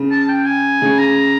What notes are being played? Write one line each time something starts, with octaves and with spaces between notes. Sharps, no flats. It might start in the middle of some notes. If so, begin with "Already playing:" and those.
Already playing: C#3
A5
G5
G#5
C#3
A#5